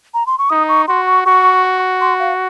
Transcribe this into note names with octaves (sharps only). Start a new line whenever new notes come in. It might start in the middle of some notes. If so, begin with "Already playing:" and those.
A#5
C6
C#6
D#4 D#6
C#6
F#4 C6
C#6
F#4 C#6
C6
F5